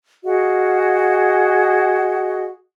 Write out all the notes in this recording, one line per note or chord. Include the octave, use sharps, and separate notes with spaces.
F#4 G#4 D#5 F5